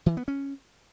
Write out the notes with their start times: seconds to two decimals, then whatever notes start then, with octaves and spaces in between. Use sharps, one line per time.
0.06 E3
0.17 B3
0.28 C#4